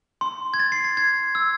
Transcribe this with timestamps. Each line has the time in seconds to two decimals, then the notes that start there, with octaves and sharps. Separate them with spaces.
0.21 C6
0.54 G#6
0.59 A6
0.72 C7
0.84 A6
0.97 G#6
1.35 E6